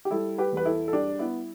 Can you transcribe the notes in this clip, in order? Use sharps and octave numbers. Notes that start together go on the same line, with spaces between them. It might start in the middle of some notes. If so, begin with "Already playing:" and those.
G4
G3 E4 A4
G4 B4
E2 B4
E4 A4
A4
G3 D4 G4
B3 E4